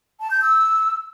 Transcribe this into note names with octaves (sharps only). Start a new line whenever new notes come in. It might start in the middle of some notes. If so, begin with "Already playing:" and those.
A5
G6
E6